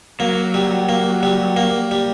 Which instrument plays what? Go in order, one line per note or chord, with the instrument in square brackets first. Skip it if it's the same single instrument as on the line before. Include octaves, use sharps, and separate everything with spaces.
[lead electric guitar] F#3 [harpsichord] A#3
[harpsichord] G3
A#3
G3
A#3
G3